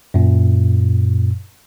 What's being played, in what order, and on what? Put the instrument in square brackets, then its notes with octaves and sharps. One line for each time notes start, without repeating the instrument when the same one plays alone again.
[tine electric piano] F#2 A#2